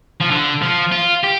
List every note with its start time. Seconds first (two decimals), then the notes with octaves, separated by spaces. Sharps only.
0.20 F3
0.30 D3
0.62 F3
0.92 F4
1.23 G4